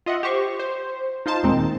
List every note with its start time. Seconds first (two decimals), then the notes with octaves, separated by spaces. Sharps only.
0.06 F4 D#5 E5 F#5
0.23 G4 C5 C#6
0.59 C5
1.26 D#4 F4 C5 A5
1.43 D#2 A#2 D#3 G#3 C4 D#4